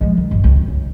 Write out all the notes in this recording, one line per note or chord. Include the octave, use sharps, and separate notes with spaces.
F3 G#3
D#3
G1
C#2
D2
C#3